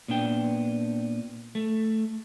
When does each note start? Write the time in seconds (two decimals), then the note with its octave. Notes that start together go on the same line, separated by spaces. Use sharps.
0.08 A#2 B3 D4 G5
1.55 A3